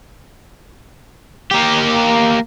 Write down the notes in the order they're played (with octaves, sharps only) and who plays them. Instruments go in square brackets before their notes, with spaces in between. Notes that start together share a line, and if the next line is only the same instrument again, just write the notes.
[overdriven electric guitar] A#3 G4